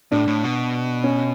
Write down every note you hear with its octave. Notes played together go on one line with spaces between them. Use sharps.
A2 D4
A2
B2
C#4